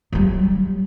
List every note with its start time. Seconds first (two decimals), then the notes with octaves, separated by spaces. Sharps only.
0.13 F#3 G3